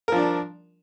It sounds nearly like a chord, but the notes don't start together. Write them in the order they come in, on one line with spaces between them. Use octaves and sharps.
A#4 F3 D4